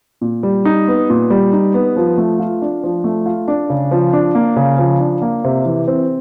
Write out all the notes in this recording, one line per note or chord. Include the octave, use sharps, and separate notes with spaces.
A#2
G3
D#4
B3
A#2
G3
D#4
B3
F3
A3
F4
D4
F3
A3
F4
D4
C#3
F3
D4
A#3
C#3
F3
D4
A#3
C3
E3
C4